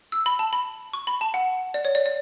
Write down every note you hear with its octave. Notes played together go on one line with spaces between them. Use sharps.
E6
B5
A5
B5
C#6
B5
A5
F#5
D5
C#5
D5
D5